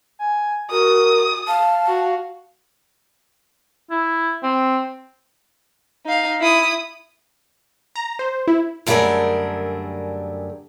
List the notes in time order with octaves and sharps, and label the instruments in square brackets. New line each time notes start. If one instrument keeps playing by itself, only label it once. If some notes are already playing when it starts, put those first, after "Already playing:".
[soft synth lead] G#5
[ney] F#4 [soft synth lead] A#4 [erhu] D#6
[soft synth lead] F5 [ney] A5
[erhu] F#4
[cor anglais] E4
C4
[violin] D#4 F5
E4 D#6
[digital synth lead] A#5
C5
E4
[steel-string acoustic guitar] F#2 D3 G3 A3 G#4 A#4